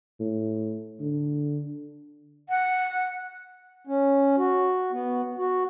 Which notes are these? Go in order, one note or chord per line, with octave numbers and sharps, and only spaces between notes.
A2
D3
F#5
C#4
F#4
B3
F#4